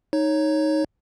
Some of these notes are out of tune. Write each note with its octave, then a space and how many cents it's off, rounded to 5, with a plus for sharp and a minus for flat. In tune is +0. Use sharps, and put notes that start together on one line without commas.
D#4 +0 C#5 +0